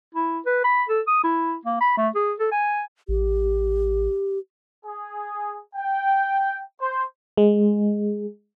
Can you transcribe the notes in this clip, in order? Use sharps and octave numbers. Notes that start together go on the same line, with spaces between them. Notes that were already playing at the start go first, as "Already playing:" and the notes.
E4
B4
B5
A4
D#6
E4
A#3
B5
A3
G#4
A4
G#5
A1 G4
G#4
G5
C5
G#3